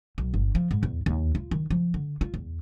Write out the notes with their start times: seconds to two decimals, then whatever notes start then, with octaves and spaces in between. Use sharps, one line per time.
0.18 B1
0.34 G1
0.55 F3
0.71 G#2
0.83 E2
1.06 D#2
1.35 F4
1.51 D#3
1.70 F3
1.94 D3
2.21 F4
2.34 E2